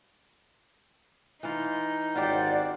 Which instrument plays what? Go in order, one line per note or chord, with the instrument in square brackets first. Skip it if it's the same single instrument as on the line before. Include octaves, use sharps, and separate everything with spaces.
[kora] E3 F4 [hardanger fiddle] D#4
[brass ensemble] G#1 C#4 F#5 [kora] F4 G4 C5 [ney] D5